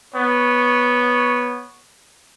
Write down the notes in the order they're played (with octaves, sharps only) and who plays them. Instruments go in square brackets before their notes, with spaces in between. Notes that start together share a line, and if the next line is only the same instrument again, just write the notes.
[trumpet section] B3 C#5